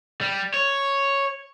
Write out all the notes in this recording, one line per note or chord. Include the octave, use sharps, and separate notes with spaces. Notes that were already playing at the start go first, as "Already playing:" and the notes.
G3
C#5